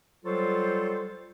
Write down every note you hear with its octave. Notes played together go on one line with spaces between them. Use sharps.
F#3 G3 F4 A4 C5